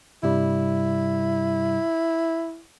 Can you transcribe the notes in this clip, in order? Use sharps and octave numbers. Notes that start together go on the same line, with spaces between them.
G2 C3 G3 E4